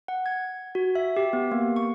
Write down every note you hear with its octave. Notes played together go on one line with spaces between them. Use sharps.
F#5
G#6
F#4
E5
G4
B3
A#3
C#6